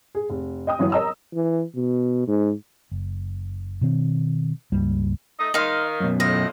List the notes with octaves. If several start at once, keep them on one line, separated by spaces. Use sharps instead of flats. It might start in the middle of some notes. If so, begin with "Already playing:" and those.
G#4
F1
D#5 G5 D#6
G1 E3 F#3
A#4 C#5 D#5 A#5 D#6 E6
E3
B2
G#2
F#1
B2 D#3 C4
C#2 G2 G3 A#3
A3 D#4 D#5
D#3 D#4 D#5 F5 C6
F#2 B2
A2 F3 D#5